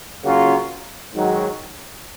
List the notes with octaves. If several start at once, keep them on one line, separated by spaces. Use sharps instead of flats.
C#3 F#3 A#3 C#4 F4
G#2 D#3 F#3